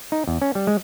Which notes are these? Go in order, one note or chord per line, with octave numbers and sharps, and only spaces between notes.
D#4
E2
C#4
G3
G#3